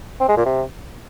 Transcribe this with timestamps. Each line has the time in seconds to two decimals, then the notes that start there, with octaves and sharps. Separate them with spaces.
0.20 C4
0.29 G#3
0.37 A#2
0.45 C3